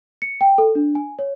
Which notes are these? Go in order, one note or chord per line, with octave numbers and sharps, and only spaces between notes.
C#7
G5
A4
D4
G#5
C#5